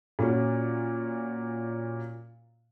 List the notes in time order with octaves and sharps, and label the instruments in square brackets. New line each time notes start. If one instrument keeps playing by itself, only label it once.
[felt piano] A#2 C#4 F#4